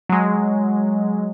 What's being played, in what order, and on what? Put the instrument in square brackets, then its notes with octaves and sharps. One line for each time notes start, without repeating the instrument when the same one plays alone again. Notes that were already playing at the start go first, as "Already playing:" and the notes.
[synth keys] F#3 G#3